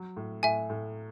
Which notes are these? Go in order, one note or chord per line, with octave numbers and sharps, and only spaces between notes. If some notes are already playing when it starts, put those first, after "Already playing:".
Already playing: F#3
A2
A2 E5 G#5
A2